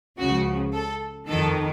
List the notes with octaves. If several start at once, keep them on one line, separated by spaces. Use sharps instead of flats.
C#2 C#3 F3 F#4
A4
F2 D#3 A4